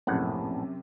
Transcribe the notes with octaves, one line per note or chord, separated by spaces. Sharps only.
A#1 F#2 A2 C3 F#5